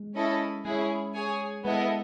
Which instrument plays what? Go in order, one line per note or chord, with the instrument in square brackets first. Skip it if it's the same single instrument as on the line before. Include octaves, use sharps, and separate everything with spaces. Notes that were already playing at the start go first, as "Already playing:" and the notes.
Already playing: [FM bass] G#3
[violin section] C#4 E4 A4 D#5
[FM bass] G#3 [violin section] C#4 E4 G#4
[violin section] G#4 C#5 G#5
[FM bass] G#3 [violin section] B3 E4 A4 D#5